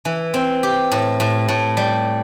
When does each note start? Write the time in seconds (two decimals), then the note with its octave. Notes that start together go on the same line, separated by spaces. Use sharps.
0.05 E3
0.34 C4
0.63 G4
0.92 A2
1.20 A2
1.48 A2
1.77 G3